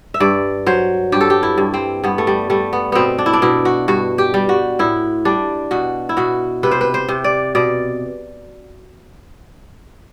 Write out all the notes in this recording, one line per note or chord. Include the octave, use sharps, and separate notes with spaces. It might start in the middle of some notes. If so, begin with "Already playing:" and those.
E5
G2 D5
F#3 C5
G2 G4
A4
G4
E4
G2
C4
G2 B3
A3
G3
G3 A3
B3
B2 B3 C4
D4
E4
D4
B2 E4
F#4
G2 F#4
G4
G3
F#4
A2 E4
G3 D4
B2 F#4
E4
B2 F#4
C3 B4
C5
B4
C5
C3
D5
B2 D5